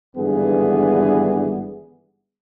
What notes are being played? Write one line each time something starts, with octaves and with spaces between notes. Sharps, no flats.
G#1 G2 D3 E3 B3 G#4